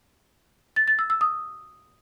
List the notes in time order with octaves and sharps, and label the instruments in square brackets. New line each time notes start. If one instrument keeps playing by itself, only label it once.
[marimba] A6
A6
E6
E6
D#6